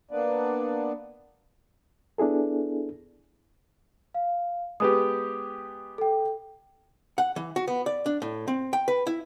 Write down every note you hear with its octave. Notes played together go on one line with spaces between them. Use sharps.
A#3 B3 D4 B4 D5
B3 D4 E4 G#4 A4
F5
G#3 B3 G4 D#6
A4 G5
F#5
E3
F#4
B3
D5
D4
A2
C4
G5
B4
E4